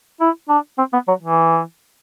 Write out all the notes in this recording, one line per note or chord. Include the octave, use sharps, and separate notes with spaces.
E4
D4
C4
B3
F#3
E3